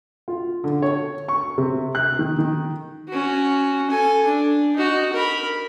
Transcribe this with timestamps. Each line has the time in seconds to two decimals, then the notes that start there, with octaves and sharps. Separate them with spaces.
0.28 F4
0.64 D3
0.82 C#5
1.28 C#6
1.58 C3
1.95 F#6
2.19 D#3
2.38 D#3
3.09 C#4 F#4
3.90 A4 G#5
4.26 D4
4.76 D#4 F#4
5.13 A#4 B5